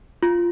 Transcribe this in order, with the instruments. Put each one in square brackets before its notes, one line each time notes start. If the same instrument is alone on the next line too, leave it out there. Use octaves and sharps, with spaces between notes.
[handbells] F4